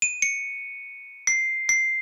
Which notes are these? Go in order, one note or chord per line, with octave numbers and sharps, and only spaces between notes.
D#7
C#7
C7
C7